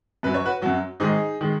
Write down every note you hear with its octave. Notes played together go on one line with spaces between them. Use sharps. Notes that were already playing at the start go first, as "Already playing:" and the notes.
F#2 F#3 B4
C#5
F#4 B4
F#2 F#3 F#4
G#2 D#3 G#3 D#4 G#4
D#3 G#3